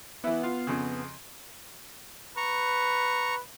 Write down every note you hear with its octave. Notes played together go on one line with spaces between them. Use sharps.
E3 B3 E4
F4
F2 C#3
B4 A#5 C#6